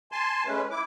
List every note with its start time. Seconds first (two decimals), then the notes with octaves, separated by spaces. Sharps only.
0.12 G#5 A5 C6
0.46 G#3 A3 C#4 B4
0.71 E4 D6